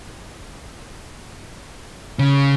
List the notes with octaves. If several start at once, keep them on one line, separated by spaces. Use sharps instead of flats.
C#3